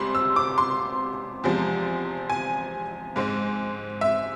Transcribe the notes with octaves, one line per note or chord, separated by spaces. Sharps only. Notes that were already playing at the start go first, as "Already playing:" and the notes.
Already playing: C2 C3 G#3 C4 B5 C6
E6
D6
C6
E2 C3 F3 G#3 C4
G#5
G#2 G#3 C4
E5